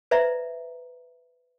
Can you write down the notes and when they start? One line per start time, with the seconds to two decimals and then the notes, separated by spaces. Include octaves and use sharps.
0.11 B4 C5 D5 E5 A#5